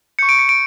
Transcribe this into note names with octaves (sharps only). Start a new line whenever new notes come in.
C#6 G6 C#7
D7
C#7
D7